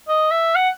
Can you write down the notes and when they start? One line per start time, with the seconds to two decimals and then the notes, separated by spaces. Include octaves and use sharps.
0.09 D#5
0.31 E5
0.55 F#5